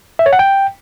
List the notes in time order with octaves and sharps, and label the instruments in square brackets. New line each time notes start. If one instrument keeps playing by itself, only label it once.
[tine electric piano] E5
C#5
F#5
G5